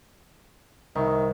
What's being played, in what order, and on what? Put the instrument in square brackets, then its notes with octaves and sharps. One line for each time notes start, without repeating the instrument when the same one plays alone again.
[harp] C2 [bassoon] D#3